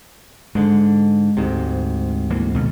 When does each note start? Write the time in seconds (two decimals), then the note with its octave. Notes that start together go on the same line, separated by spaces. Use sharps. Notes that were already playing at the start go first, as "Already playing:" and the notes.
0.55 G#2 D3 G#3
1.37 D2 G#2 C3
2.30 E3 A#3
2.54 G#1 B2 A3